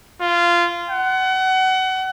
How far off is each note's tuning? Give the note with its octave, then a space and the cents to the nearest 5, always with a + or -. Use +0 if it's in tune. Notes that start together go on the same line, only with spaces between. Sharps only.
F4 -15
F#5 +25